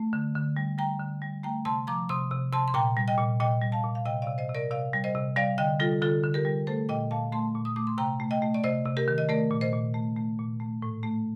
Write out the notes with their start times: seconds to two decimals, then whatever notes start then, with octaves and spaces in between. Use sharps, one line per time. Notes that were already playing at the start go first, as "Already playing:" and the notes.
Already playing: A3
0.13 D3
0.35 D3
0.57 G3
0.78 G3 G5 A#5
1.00 D3
1.22 G3
1.43 A3 G5 A#5
1.65 C3 A5 C6
1.87 F3 A#5 D6
2.09 C3 C6 D#6
2.31 C3
2.52 C3 A5 C6
2.68 C6
2.74 A#2 G5 A#5
2.97 G3
3.08 D#5 G5
3.18 A#2
3.40 A#2 D#5 G5
3.62 G3
3.72 F5 A5
3.84 A#2
3.95 F5
4.05 C3 D#5 G5
4.22 D5 F5
4.27 C3
4.38 C5 D#5
4.49 C3
4.55 A#4 D5
4.71 C3 D5 F5
4.93 G3
5.04 C5 D#5
5.15 C3
5.36 G3 D5 F5
5.58 D3 D#5 G5
5.80 G3 F4 A4
6.02 D3 F4 A4
6.23 D3
6.34 G4 A#4
6.45 G3
6.67 A3 A4 C5
6.89 A#2 D#5 G5
7.11 A#2 F5 A5
7.32 A3 A5 C6
7.55 A#2
7.65 D#6
7.76 A3 D6
7.87 C6
7.98 C3 G5 A#5
8.20 A3
8.31 D#5 G5
8.42 A3
8.54 D5
8.64 C3 C5 D#5
8.85 C3
8.97 G4 A#4
9.08 D#3
9.18 D#5
9.29 A3 A#4 D5
9.51 A#2
9.61 C5 D#5
9.73 A#2
9.94 A3
10.17 A3
10.39 A#2
10.60 A3
10.82 A2
11.03 A3